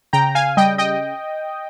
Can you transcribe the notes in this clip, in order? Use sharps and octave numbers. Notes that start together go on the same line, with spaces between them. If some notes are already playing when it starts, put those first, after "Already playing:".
C#3 G5 A#5
F5 G#5
G3 D#5 G5
D#5 G5